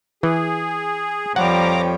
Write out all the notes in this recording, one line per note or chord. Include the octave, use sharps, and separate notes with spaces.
E3 G#4
F2 F3 G3 C#5 F#5 G5 A#5 D6